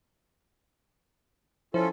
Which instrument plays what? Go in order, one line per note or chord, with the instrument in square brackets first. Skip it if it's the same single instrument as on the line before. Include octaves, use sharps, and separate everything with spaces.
[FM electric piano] F3 E4 C5 [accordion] C#4 F4 A4